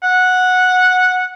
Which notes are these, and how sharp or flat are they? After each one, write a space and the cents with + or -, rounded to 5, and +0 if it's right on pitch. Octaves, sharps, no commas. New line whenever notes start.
F#5 -10